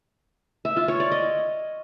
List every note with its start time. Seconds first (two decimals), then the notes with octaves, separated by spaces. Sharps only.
0.65 E5
0.77 F4
0.88 C#5
1.00 D5
1.12 D#5